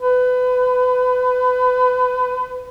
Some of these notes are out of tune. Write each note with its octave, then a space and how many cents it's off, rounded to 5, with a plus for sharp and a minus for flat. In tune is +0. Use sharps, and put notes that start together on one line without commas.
B4 +30